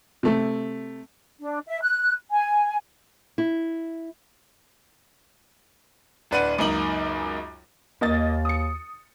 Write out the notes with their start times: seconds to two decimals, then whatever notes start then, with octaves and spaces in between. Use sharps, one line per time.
0.23 C3 A3
1.40 D4
1.67 E5
1.83 F#6
2.30 G#5
3.38 E4
6.31 D1 D4 B4 D5 F#5 D#7
6.58 C#2 F#2 A#3 D#4 F#7
8.01 D#2 A#3 D#5 A6
8.45 D#6 C#7